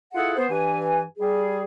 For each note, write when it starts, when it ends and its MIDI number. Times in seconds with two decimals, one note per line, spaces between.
0.14 0.35 64
0.14 0.35 65
0.14 0.35 68
0.14 0.35 69
0.14 0.35 78
0.37 0.48 59
0.37 0.48 72
0.50 1.02 43
0.50 1.02 52
0.50 1.02 80
1.19 1.64 55
1.19 1.64 68